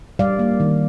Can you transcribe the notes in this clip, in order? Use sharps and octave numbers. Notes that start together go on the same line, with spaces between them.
G3 D5 F5
A#3
D#3